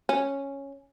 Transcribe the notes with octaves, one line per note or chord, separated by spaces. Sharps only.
C#4